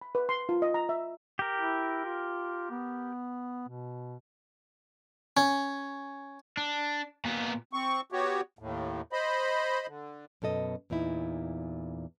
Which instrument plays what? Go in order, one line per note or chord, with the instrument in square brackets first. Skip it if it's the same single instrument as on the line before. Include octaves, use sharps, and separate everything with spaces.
[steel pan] B5
B4
C6
F4
D#5
A#5
E5
[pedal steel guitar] G4 A#4
[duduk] E4
F4
B3
B2
[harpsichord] C#4
[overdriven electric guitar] D4
A#2 B3
[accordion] C4 C#6
B3 F#4 G4 C#5
D#2 A2
C5 D#5 B5
D3
[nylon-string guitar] F#2 B2 A4 D#5
E2 A#2 D#4 E4